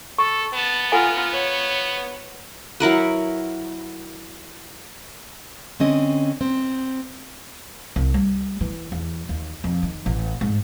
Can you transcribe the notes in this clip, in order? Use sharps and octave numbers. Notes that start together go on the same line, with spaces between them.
A4 C#6
B3 A5
F4 A4 F#5 G#5 A#5
C#5
F#3 E4 A#4 B4
D3 C4 C#4 D#5
C4
C2
G3
E3
E2
D#2
F2
D#3
A1
G#2